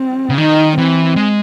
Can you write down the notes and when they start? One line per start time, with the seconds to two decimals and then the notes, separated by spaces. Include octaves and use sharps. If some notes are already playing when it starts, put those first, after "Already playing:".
Already playing: C4
0.30 C#3
0.38 D#3 D#4
0.77 E3 C4
1.16 G#3